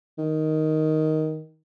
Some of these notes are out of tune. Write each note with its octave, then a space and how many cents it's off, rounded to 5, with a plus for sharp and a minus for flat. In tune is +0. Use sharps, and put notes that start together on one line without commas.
D#3 +5